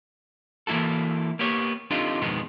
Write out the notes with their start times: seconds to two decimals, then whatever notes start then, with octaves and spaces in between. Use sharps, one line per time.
0.67 E3 A#3 E4 F#4 A4
1.39 A#3 B3 G4 C#5
1.90 C4 D4 D#4 F4 G4 A4
2.21 F2 G#2 B2 D#3 G#3 B3